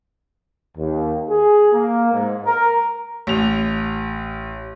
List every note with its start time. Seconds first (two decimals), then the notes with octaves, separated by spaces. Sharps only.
0.77 D#2
1.29 G#4
1.73 A#3
2.12 G#2
2.45 A#4
3.27 A1 F7